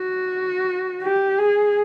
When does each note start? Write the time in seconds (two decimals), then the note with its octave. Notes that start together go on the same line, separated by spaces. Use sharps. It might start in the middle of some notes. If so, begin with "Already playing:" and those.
Already playing: F#4
1.02 G4
1.38 G#4